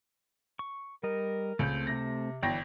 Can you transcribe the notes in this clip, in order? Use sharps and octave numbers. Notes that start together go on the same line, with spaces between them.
C#6
G3 A#4 D#5
C#2 A3 C4 G6
C3 A#6
G1 E3 D5 G5 A#6